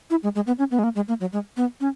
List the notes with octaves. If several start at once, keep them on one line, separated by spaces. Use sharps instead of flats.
E4
G#3
G#3
B3
C#4
B3
G#3
A#3
G#3
A#3
F#3
G#3
B3
C#4